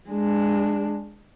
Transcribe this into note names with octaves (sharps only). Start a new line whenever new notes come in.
G#3 D4